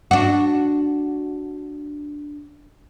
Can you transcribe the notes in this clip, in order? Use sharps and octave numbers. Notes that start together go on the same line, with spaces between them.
D4 F#4